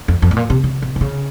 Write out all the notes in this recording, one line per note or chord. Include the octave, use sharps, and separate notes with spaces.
F2
F2
A2
A#2
C3
C#3
C3
C3
C#3